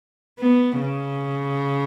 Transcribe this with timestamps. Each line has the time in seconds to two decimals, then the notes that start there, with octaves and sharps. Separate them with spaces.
0.40 B3
0.80 C#3